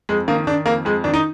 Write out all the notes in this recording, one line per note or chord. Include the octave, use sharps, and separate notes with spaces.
F2 G#3
D#3 A#3
D#3 D4
F2 A#3
F2 G#3
D#3 D4
D#4